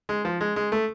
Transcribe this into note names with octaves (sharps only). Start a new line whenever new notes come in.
G#3
F3
G#3
G#3
A3